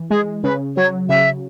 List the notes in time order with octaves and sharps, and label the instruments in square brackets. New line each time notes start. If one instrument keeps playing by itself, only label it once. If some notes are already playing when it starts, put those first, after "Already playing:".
Already playing: [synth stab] E3
[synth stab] G#3 [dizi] G#4
[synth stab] C#3 [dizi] B4
[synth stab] F#3 [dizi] C#5
[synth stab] C#3 [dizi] E5